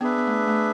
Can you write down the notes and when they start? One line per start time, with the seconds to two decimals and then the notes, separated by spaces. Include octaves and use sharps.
0.01 B3 D4 G#4 B4 E5
0.18 B3
0.27 A3
0.47 A3